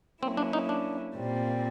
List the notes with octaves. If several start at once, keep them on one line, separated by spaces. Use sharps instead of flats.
F#3 A#3 C4 C#4 E4
D4
D#4
D4
A#2 G3 C4